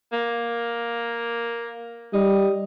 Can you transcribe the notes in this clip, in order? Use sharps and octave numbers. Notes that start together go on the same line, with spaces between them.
A#3
G3 D#4